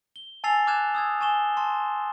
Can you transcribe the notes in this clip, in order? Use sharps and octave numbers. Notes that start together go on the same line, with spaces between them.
G7
G#5 A5 E6 A6 C7 F7
D6 F6 F#6 G#6 E7
D#6 E6 G#6
G#5 C#6 E7 G7
A5 C6